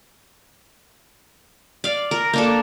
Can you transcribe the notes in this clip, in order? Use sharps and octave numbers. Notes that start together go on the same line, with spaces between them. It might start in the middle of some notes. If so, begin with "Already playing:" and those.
D5 F5
A#4
A#3 D4 A4